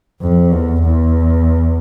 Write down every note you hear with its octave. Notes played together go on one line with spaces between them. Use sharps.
F2
E2
E2